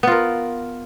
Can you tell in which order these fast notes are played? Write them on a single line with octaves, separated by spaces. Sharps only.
B3 F4 A#4